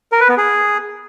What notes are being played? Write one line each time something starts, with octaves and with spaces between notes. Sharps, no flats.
A#4
B4
B3
G#4